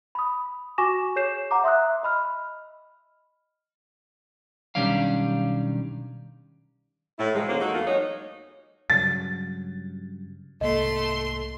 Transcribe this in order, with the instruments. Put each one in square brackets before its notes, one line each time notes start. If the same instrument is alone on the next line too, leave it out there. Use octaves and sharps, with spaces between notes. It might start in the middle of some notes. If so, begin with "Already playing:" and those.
[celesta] B5 D#6
F#4 G#5 C#6 D6 A#6 E7
G#4 C#5 G6 C7 E7
F#5 A#5 D6
E5 C6 D#6 E6 F#6
D#5 B5 F6
[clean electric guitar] B1 D#3 G3 C#4 D4 F5
[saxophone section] A2 E4
C3 D#3 F3 G#3
D3 E3 F#3 A#3 C#4 C5
D#4 F#4 A4
E2 A3 A#3 F4 F5
F#3 G#3 D#4 C#5
[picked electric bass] G2 C#3 F#3 [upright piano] A6
[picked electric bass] C2 G#2 A#3 [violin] A3 C6 [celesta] D#5